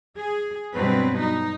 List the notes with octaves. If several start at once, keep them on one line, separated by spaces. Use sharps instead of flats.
G#4
G2 B2 F#3 C4 B4
D#4